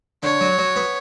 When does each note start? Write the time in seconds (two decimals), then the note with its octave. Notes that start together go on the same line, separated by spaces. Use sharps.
0.23 D3 C#5
0.41 F#3
0.58 F#3
0.76 B3